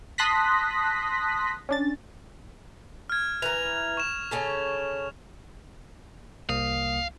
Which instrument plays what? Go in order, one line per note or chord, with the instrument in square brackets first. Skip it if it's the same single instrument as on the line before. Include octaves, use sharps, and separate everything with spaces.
[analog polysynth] A5 C6 D#6 F#6 A#6 B6
C#4 D4 A6
[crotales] F6 G#6
[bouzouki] E3 A#4 [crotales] F7
[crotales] C#6 E7
[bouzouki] C#3 C#4 A4
[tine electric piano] C2 A#3 D#6 [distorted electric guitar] F5